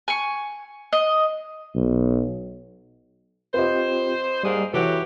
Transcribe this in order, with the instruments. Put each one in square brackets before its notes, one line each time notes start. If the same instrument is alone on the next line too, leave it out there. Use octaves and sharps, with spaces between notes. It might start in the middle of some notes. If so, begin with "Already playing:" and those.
[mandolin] G#5 C#6
D#5
[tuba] B1
[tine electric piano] C4 F4 G4 [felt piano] B4 D#5 [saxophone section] C5
[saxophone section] G#2 A#3 G#4 [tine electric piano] G3
[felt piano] E3 F#4 [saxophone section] F#3 G4 A4 [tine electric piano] B4